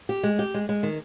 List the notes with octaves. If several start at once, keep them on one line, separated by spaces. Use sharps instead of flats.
G4
G#3
G4
G#3
G#3
D#3